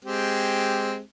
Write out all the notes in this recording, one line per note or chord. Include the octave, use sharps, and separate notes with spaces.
G#3 C4 G4